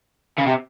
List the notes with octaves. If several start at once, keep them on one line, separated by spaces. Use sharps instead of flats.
C#3
C3